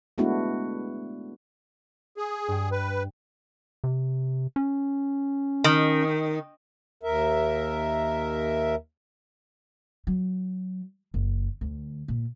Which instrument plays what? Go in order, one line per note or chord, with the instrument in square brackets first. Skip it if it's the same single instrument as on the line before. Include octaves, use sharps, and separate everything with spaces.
[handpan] G#3 A3 B3 D4 E4 F#4
[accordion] G#4
[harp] G2 G5
[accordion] B4
[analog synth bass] C3
C#4
[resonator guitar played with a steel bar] D#3
[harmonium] D#2 A#4 E5
[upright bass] F#3
F#1
D2
A#2